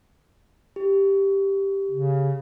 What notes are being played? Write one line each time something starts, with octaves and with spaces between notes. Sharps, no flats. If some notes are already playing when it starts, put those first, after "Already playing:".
G4
C#3